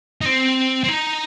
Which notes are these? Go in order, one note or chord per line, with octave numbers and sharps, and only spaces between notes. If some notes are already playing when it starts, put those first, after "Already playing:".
D#4
C4
C4
D#4